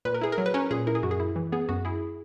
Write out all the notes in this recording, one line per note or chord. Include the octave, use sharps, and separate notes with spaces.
A#2 B4
A#4
E4 G#4
A#4
F#3
B4
C#4 A#4
A#2 G#4
E4 A#4
G#4
F#2 F#4
G#4
E4
E3
B3 G#4
F#2 F#4
E4 G#4